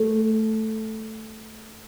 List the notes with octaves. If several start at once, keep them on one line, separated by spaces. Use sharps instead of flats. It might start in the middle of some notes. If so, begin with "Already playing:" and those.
Already playing: A3